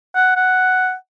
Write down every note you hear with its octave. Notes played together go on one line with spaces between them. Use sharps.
F#5
F#5